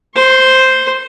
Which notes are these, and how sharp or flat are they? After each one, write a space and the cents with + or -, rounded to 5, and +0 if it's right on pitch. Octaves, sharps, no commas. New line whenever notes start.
C5 +0 C6 +35